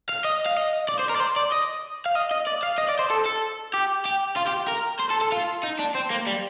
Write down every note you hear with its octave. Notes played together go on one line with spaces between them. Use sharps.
F5
D#5
F5
D#5
D5
C5
A#4
D5
C5
D5
D#5
F5
D#5
D#5
D5
F5
D#5
D5
C5
A4
A4
G4
G4
F4
G4
A#4
C5
A4
A4
F4
D#4
D4
C4
A#3
G3